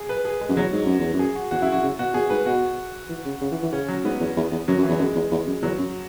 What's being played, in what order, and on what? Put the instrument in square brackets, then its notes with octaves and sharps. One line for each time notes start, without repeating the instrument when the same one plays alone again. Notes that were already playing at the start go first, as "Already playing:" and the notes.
Already playing: [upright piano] G#4
B4
G#4
G#3
[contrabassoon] F#2
[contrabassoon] E2 [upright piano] F#3
[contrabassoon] G#2
F#2
E2
F#2
[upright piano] G#4
F#4
[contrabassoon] E2 [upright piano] F#4
[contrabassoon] F#2 [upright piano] E4
[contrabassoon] F#2 [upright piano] F#4
[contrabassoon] C#3
[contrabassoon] B2 [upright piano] F#4
[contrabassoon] B2 [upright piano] G#4
[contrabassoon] G#2 [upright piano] B4
[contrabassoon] B2 [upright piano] F#4
[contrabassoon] E3
C#3
C#3
E3
E3
[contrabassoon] C#3 [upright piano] C#4
[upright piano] F#3
[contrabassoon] G#2 [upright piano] B3
[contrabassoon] E2
E2
E2
[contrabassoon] F#2 [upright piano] F#3
[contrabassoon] F#2
[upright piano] E3
[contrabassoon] E2
[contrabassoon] F#2 [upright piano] G#3
[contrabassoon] E2
E2
F#2
[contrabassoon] E2 [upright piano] F#3
[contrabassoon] F#2